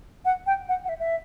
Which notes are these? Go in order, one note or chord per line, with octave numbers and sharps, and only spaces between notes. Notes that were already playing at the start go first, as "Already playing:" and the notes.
F#5
G5
F#5
F#5
E5
E5